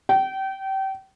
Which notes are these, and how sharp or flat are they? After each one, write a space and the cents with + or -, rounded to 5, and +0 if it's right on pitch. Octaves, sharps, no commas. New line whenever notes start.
G5 -30